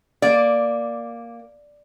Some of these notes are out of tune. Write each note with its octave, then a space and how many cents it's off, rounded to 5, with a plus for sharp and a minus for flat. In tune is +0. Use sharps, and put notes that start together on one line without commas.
A#3 +0 D5 +0